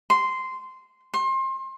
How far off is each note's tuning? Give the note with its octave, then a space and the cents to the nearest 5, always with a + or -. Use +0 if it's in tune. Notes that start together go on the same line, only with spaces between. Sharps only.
C6 -10
C6 +30